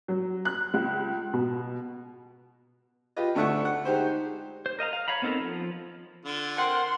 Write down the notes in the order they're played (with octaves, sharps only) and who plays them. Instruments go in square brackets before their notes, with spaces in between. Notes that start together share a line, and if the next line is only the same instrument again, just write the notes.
[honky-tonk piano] F#3
F#6
C#2
B2
[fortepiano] F4 G4 B4 D#5
D2 A3 D4 E5 F#5 C#6
F#5
G#3 D#4 G4 C5
[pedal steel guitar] C5
A#4 D#5 F5 A#5
F5
C#5 F5 A#5 B5
B3 C4 D#4 A4 A#4
F3
[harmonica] D3 F4
[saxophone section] C4 A#4 F#5 [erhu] C6